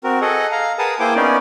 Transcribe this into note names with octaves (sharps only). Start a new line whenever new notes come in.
C4 F#4 A#4
G#4 A4 D#5 F#5
F5 A#5
G#4 A#4 B4 F#5 A5 D#6
A#3 E4 G#4 C5 G5 D6
B3 C#4 D#4 A#4 D5